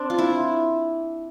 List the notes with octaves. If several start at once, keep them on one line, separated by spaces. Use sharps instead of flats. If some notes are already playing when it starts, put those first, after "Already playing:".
Already playing: C4 D4
F4
E4